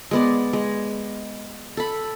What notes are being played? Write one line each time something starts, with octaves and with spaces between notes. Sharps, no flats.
G#3 B3 D5
G#3
A4 B5